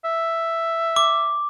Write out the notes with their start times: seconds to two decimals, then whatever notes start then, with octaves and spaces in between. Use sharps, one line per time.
0.05 E5
0.96 D6